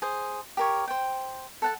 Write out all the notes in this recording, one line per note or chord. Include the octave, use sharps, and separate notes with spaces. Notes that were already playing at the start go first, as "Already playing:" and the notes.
G#4 C5
G4 A#4 C#5
C5 G5
A4 F#5 A5